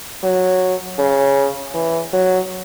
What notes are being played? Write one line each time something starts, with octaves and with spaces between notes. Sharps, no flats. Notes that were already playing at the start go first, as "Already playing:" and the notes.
F#3
C#3
E3
F#3